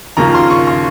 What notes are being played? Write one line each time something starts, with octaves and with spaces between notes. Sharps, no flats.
D#2 C#3 F3 A#3 F4 A#5
C6
C#6
C6